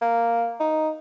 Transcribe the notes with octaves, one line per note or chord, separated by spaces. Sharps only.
A#3
D#4